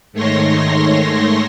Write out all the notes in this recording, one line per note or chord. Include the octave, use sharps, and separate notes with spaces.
G#2 D#3 A3 C#5 C6 A#6